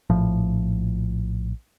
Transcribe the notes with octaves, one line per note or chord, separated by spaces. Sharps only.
A#1 A2 F3